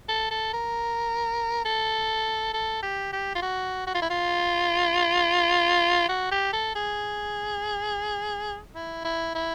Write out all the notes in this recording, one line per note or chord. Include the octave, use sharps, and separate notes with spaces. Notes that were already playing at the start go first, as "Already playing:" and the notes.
A4
A4
A#4
A4
A4
G4
G4
F4
F#4
F#4
F4
E4
F4
F#4
G4
A4
G#4
E4
E4
E4